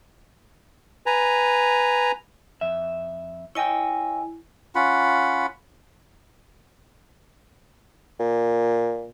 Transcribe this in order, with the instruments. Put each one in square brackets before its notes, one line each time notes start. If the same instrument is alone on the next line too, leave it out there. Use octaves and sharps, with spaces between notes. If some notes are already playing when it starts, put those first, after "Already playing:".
[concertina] B4 G#5 A#5
[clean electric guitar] F2 E5
[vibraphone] E4 G#5 [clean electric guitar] C#5 D#5 G5
[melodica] C#4 F4 F#5 B5
[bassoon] A#2